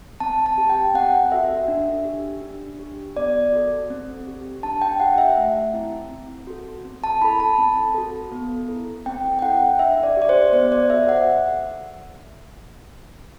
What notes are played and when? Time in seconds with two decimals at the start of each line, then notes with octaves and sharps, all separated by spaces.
0.20 C4 A5
0.46 A5
0.58 G4
0.70 G5
0.94 C4 F#5
1.32 F#4 A4 E5
1.68 D4
2.05 G4
2.42 D4
2.79 G4
3.17 B3 D5
3.52 F#4 A4
3.90 C4
4.27 G4
4.63 D4 A5
4.82 G5
5.00 G4 F#5
5.18 E5
5.37 A3
5.73 C4 E4
6.11 C4
6.47 F#4 A4
6.85 C4
7.04 A5
7.22 E4 B5
7.24 A4
7.40 A5
7.58 C4
7.95 F#4 A4
8.31 B3
8.69 E4 A4
9.06 C4 G5
9.39 G5
9.42 E4 A4 F#5
9.79 D4 E5
10.03 D5
10.17 G4 D5
10.29 C5
10.53 B3 C5
10.72 D5
10.89 A4 E5
10.94 F#4
11.09 F#5